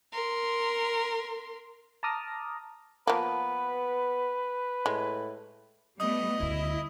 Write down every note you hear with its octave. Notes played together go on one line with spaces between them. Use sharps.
A#4 C6
A5 A#5 D6 D#6 F6 A#6
F3 A#3 B3 B4
A2 G#3
G3 A3 B3 D#5 D#6
D2 C#3 E4